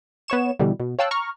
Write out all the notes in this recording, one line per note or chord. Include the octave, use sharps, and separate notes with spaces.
B3 C#5 C#6 E7
B2 D3 E3 G3
B2
C#5 F5 G5 A5 E6 F#6
A#5 C#6 F6